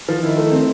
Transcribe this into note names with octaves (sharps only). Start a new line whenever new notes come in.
F3
D#3 E4
A3
C4